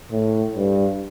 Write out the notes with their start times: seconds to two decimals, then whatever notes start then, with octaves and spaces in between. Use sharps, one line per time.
0.11 A2
0.55 G2